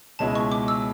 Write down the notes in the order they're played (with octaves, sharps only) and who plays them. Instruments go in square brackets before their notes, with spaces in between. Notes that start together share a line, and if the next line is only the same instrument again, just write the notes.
[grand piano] C#2 B2 G#3 C#4 E4 [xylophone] A5
[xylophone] C#6
D6
E6